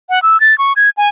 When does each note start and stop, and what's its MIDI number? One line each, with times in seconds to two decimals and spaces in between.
0.09 0.22 78
0.22 0.40 88
0.40 0.57 93
0.58 0.73 85
0.76 0.90 92
0.97 1.09 80